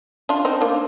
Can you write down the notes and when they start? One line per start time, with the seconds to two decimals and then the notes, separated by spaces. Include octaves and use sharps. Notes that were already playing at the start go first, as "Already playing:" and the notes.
0.29 D4 F4
0.45 C4 D#4
0.61 A#3 D4